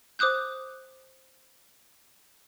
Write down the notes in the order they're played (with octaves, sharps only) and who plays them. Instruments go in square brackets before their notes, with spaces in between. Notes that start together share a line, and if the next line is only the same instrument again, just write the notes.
[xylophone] C5 D6 D#6 F#6 G6